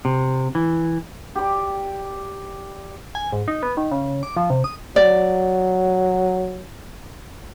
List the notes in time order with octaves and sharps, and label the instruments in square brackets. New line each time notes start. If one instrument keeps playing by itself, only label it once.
[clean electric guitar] C3
E3
[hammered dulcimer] G4 D5
[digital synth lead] G#5
G#2
D#4
B3
D#3
C#3
D6
F3
C3
D#6
[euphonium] F#3 [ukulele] D5